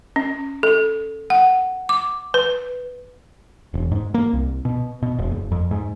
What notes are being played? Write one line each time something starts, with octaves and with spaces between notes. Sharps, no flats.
C#4
A4
F#5
D6
B4
E1
G#2
A#3
C2
B2
B2
E1
F#1
F2
G#2